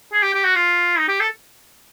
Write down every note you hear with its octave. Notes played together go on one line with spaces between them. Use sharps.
G#4
G4
G4
F#4
F4
D#4
G4
A4